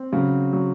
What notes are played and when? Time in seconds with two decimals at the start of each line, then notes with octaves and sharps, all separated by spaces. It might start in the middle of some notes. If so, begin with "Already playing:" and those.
Already playing: C4
0.12 C#3 F#3
0.53 F#3